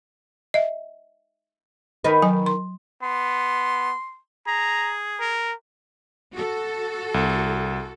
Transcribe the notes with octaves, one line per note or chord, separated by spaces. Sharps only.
D#5 E5
D#3 D#4 B4
F#3 G#5
C6
B3 C6
G#4 A#5
A#4
F#4 A4
C2